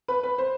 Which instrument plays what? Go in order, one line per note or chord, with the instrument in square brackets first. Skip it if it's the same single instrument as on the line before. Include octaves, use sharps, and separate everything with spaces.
[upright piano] B4
B4
C5